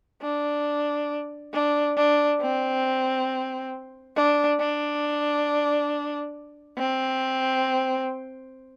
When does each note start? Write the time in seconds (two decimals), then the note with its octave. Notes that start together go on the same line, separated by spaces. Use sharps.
0.22 D4
1.54 D4
1.97 D4
2.41 C4
4.16 D4
4.60 D4
6.78 C4